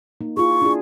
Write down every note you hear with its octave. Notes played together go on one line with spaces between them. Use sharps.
A#3 D#4
E4 F4 G#4 C#6
D4 E4 G#4